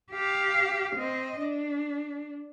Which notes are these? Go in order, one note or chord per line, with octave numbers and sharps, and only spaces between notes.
G4 F5
C4 D#5
D4